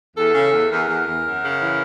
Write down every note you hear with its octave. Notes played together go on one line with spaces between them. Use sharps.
E2 A4
C#3
E2
E2 A#4
E2
E2
F#2
C#3
E3